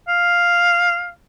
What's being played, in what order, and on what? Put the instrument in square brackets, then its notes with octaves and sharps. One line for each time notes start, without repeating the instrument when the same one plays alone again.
[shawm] F5